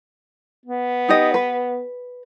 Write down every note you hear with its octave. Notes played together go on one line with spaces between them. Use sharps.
B3
D#4 G4 D#5
B4